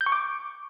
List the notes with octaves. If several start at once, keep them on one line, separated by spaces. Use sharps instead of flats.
G6
C#6
D6